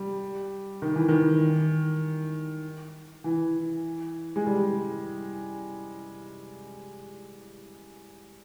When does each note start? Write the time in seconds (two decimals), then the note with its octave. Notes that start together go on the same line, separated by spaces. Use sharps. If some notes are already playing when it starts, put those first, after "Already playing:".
Already playing: G3
0.82 D#3
0.96 E3
1.08 D#3
3.24 E3
4.36 G#3
4.47 G3